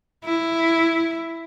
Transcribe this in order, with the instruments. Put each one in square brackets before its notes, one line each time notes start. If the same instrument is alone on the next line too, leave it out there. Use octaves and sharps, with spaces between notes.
[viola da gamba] E4